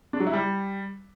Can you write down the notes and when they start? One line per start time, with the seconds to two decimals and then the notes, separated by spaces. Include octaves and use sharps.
0.13 D4
0.20 F#3
0.27 E4
0.33 G3